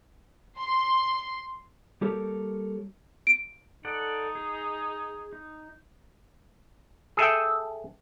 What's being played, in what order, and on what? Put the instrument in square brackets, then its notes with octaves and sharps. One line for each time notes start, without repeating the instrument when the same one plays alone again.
[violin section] C6
[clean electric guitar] G3 A#3 G4 A4 A#4 C#5
[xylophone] D7
[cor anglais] D#4 [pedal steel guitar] A4 D5 F#5
[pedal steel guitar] G#4
D#4
[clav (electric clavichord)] G#4 A4 E5 G5